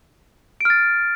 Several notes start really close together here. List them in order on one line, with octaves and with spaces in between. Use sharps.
D7 F6 A6